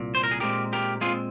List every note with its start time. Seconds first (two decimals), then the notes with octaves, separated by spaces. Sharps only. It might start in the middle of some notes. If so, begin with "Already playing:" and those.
Already playing: C2 A#2
0.15 C5
0.24 A#4
0.31 G#4
0.40 A#2 G#3 C4 G4 A#4
0.73 G4 A#4
1.01 A#2 G#3 C4 F4 G#4